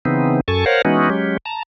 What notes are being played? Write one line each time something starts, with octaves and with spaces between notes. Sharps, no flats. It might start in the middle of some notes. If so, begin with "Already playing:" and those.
C#3 E3 B3 C4 D#4
F#2 A4 G#5 A5 C#6
A#4 C5 C#5 F5 F#5
E3 G#3 B3 C#4 D#4 F#4
F#3 G#3 C#4 G4
A5 A#5